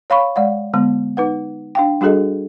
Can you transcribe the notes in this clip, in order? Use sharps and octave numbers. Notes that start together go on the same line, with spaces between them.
C#5 F5 B5 C#6
G#3 D5 F5 F#5
D3 G#3 B3
D#4 B4 F#5
D4 F5 G5
G3 D4 F#4 G#4 A4 D#5